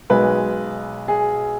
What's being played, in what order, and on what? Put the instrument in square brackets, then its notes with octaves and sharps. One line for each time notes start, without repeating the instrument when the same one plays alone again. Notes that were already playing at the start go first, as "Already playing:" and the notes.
[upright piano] B1 B2 G#3 B4
G#4